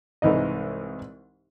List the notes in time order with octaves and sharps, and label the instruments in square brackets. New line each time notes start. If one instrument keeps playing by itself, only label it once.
[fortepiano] C2 G#2 E3 D#4 D#5